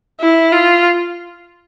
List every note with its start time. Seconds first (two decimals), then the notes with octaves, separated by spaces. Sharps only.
0.20 E4
0.52 F4